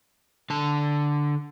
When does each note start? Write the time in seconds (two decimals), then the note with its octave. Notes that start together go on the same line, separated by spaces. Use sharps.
0.50 D3 A5